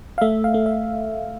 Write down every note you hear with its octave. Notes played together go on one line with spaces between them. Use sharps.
F5
A3 E5
F5
A3
E5